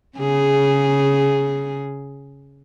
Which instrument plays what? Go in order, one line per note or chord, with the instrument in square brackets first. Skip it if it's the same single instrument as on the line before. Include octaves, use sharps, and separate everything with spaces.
[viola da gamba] C#3 G#4